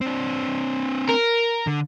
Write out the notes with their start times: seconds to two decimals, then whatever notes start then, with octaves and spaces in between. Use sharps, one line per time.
0.01 C4 D4
1.09 A#4
1.67 D3